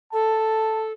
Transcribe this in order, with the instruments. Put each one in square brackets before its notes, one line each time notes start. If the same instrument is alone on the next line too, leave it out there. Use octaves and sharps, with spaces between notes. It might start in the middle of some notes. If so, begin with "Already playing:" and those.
[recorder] A4 [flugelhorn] A5